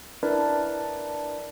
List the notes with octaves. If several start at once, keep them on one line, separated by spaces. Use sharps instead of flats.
D4 E4 A#4 B4 D5 A5